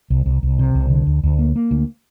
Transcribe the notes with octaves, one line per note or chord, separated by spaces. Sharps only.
C2
C2
C2
C3
C2
D3
D2
D2
A#3
A#3
D2